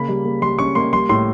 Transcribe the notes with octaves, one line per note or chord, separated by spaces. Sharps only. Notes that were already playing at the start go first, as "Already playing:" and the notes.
Already playing: C#3 A#3 B5
G3
A#3
G3 C6
C#4 C#6
A#3 C6
G3 C6
A2 C6